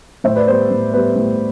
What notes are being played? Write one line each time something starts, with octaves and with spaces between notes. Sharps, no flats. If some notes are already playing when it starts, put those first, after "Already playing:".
A2 C5 E5
B4 D5
G3 B3 C5
A2
G3 B3 B4
A2